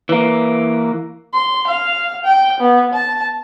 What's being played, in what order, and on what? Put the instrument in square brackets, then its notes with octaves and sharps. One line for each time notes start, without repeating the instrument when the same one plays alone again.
[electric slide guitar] E3 A#3
[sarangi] C6
F5
G5
B3
A5